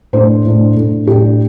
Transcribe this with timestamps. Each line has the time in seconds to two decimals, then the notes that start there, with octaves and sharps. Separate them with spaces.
0.13 A2 A3 D4 C5
0.45 A2 A3 D4
0.76 A2 A3 D4
1.07 A2 A3 D4 G4